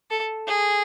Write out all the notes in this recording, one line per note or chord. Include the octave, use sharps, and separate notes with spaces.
A4
G#4